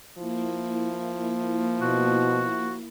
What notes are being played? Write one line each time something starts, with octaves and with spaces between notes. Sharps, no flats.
F3 A#3 E4
B2 F#4